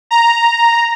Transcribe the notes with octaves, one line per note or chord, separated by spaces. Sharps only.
A#5